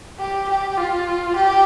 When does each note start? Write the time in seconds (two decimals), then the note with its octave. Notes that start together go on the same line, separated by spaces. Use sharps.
0.19 G4
0.48 G4
0.78 F4
1.36 G4